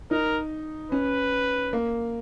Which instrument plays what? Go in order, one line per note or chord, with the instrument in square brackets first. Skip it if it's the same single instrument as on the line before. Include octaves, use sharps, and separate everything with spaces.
[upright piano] D#4 [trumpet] A#4
[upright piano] C#4 [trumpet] B4
[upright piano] A#3